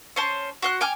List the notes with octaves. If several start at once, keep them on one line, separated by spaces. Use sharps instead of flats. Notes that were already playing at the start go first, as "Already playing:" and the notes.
C#4 C5 A5
F#4 C5 F#6
G5 G#5 D6 F6